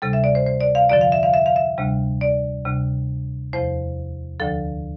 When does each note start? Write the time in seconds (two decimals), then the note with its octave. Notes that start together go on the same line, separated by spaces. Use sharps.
0.02 D2 C3 G3 A4
0.13 E5
0.24 D5
0.35 C5
0.46 C5
0.61 D5
0.75 F5
0.90 F2 D3 F3 D5
1.01 F5
1.12 E5
1.23 F5
1.34 E5
1.46 F5
1.56 E5
1.78 D2 C3 G3
2.21 D5
2.65 D2 C3 G3
3.53 E2 C3 F3 C5
4.40 D2 D3 F3 A4